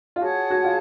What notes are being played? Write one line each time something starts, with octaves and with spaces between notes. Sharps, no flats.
F4
F#4 G#4 C#5 F#5 A5
F#4
F4